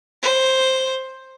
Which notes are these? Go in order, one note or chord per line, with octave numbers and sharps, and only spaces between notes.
C5